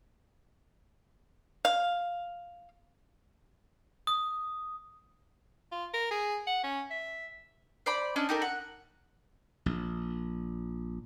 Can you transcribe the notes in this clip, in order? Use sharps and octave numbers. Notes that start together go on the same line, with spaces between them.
F5
D#6
F4
A#4
G#4
F#5
C#4
E5
C5 D5 B5
C#4 D4 D#5
D#4 G4 A4 A#4
F#5
A#1